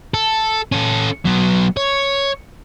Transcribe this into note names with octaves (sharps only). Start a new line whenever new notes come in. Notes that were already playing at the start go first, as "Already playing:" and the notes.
A4
C#4 A4
F#3 B3
C#5